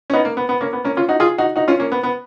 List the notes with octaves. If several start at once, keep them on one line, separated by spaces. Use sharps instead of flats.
C#4
B3 D#4
A#3
B3
B3
A#3 C#4
B3
A#3 C#4
C#4 F4
D#4 F#4
F4 G#4
D#4 F#4
D#4 F#4
C#4 F4
A#3 C#4
B3
B3